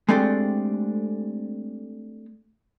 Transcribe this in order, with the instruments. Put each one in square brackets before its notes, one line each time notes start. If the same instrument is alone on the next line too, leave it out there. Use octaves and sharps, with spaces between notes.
[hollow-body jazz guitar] G#3 A3 C4 D4 G4 A4